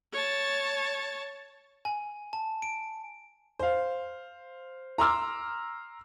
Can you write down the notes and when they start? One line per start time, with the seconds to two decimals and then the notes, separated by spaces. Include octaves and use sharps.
0.13 C#5 A5
1.85 G#5
2.33 A5
2.62 D7
3.59 C5 F5
4.98 A#5 C6 D6 E6 F6